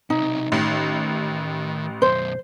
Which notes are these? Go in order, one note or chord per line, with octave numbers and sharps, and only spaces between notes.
B1 C3 D#4
A1 D#3
B1 F#2 C5